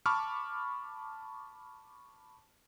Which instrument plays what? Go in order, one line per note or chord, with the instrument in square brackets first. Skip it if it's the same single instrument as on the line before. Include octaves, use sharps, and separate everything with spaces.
[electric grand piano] A5 B5 C#6 D6 F6